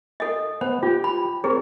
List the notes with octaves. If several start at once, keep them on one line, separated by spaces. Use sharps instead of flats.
A4 D#5
B3 C5
F4 G4 G5
B5
C4 G#4 A#4 C#5